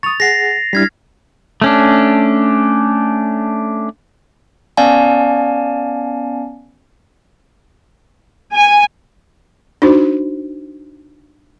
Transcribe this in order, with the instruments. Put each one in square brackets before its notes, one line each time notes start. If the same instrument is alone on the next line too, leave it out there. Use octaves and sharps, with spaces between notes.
[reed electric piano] C#6 D#6 [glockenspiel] A6 F7
[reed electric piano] G#4 F#5 [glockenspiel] A#6 C7
[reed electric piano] G3 D4 E4 [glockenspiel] F6 G#6 B6
[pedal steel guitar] A3 C#4 D4
[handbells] B3 C#4 D5 F5 G#5 A5
[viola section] G#5
[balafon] D4 D#4 F#4 C5